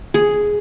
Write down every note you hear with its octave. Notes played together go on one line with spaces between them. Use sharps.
G#4